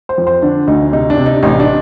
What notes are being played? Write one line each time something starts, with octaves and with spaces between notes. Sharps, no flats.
C5
F2
C5
D3 D4
D2 D#4
C3 D#4
D4
C3
D#4
A1 D#4
D4